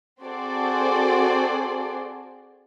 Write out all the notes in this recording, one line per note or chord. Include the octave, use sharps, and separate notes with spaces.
C4 F#4 G#4 A4 C5 D5